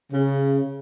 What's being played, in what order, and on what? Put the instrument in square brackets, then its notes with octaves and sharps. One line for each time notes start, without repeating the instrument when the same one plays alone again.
[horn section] C#3